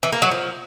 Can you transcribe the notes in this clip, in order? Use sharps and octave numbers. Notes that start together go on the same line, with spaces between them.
E3
A#3
F#3
F3